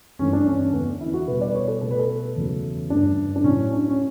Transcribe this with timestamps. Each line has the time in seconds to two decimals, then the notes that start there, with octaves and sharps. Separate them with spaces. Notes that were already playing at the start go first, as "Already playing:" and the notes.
0.19 G2 E3 A3 C#4
0.33 D4
0.47 C#4
0.60 C#4
0.73 E2 D3 A3 B3
1.01 E4
1.14 F#4
1.28 B2 G3 B4
1.41 D5
1.50 B4
1.55 C#5
1.68 A4
1.81 B2 A3 A4
1.91 B4
1.99 A4
2.36 E2 C#3 F#3 A3
2.90 G2 D3 A3 D4
3.36 D4
3.44 A2 F#3 A3 C#4
3.72 D4
3.88 C#4